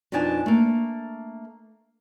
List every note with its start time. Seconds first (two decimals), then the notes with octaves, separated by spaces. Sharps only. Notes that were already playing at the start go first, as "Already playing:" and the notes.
0.12 F2 B2 D4 D#4 G#5 A5
0.46 A3 A#3